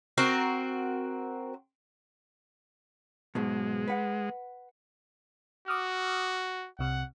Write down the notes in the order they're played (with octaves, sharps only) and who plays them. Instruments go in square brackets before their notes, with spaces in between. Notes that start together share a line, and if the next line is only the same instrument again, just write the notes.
[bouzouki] C4 F#4 A#4
[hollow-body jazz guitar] B1 G#2 B2 [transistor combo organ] G#3
[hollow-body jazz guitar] B4 F#5
[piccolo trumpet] F#4 [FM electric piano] D6 D#6 F6
[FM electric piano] C2 C3 [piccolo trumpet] F#5